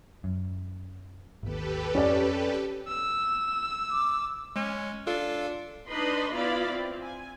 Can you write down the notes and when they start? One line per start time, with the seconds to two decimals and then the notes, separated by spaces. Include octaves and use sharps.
0.24 F#2
1.43 G#1 D#2 G4 A4 B4
1.95 F2 C#4 D5
2.88 E6
3.91 D6
4.56 G#3 C#4
5.07 D4 F4 A4 F5
5.88 D4 D#4 B4 D#5 B5 C6
6.33 B3 E4 F4 D5 F5 B5
6.70 C4
7.01 G#5